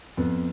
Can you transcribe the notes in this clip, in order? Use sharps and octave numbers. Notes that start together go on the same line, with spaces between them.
F2 B3